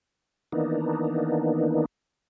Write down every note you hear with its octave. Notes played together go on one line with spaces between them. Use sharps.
D#3 E3 A#3 B3 D4 D#4